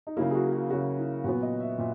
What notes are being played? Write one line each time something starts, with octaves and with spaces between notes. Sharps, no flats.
D#4
C#3 F#3 A#3 E4
G#4
F#4
G#4
F#4
C#3 F#3 A#3 F#4
E4
A#2 F#3 B3 F#4
D#5
E5
A#2 E5